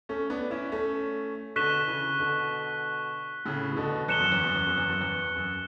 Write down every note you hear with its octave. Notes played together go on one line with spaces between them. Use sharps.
A3 C#4
B3 D4
C#4 E4
A3 C#4
B2 D3 C#6 F#6 B6 E7 G7
C#3 E3
B2 D3
A2 C#3
E3
B2 D3
E2 F#6 C#7 E7 G7
F#2
E2
F#2
E2
F#2
E2
F#2
E2
F#2